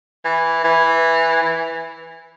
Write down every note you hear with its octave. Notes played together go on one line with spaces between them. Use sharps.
E3
E3
E3